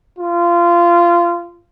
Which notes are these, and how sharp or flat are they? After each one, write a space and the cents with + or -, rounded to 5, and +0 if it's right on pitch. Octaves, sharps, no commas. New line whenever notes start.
F4 -20